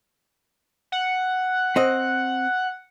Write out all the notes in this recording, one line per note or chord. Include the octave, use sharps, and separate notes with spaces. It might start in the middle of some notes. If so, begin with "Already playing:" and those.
F#5
C4 D#5